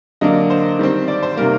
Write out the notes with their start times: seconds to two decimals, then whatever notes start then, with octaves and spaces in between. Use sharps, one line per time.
0.21 D3 F#3 A#3 D4 D#5
0.50 C5
0.79 D#3 G3 C4
1.08 D5
1.23 C5
1.37 C3 D#3 G3 A#3 A#4